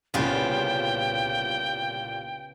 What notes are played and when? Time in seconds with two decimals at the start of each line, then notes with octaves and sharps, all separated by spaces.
0.14 C2 A#2 C#3 B3 F4 G5